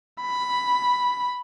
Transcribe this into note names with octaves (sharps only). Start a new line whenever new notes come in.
B5